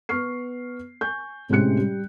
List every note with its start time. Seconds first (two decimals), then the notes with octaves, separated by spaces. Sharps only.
0.09 B3 C#6 F6 C7
1.01 G#5 C#6 G6
1.49 A2 C3 G#3 C#4 F#6 C#7
1.77 G3